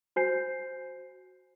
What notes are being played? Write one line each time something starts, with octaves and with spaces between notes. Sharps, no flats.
F#4 C5 G#5 G6 C7